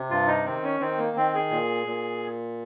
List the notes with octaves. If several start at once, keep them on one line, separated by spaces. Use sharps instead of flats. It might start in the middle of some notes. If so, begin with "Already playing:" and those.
Already playing: C3
G2 F4
D#4
D#3 C4
C#4
D#3 C4
A#3
D#3 C4
G#4
A#2
A#2